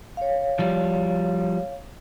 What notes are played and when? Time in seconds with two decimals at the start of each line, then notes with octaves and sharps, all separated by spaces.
0.17 C#5 F5
0.59 F3 G3